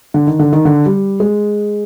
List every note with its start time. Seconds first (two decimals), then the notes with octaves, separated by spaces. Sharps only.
0.14 D3
0.27 D#3
0.39 D3
0.53 D#3
0.65 D3
0.86 G3
1.20 G#3